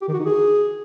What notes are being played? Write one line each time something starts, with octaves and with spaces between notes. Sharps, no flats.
G4
D#3
F#4
D#4
G#4